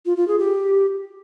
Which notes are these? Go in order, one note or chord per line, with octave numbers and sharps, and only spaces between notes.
F4
F4
G#4
G4